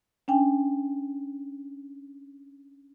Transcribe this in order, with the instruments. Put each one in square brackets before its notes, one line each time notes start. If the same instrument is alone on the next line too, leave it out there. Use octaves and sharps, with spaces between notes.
[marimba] C#4 D4 G5 G#5